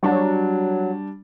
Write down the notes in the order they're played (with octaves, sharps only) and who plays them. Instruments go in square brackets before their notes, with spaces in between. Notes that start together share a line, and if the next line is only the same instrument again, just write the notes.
[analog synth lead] F#3 [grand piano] G3 D4